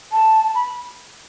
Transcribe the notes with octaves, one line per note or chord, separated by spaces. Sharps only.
A5
B5